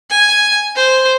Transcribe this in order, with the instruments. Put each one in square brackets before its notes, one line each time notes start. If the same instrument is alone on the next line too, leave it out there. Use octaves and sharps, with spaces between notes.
[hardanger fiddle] G#5
C5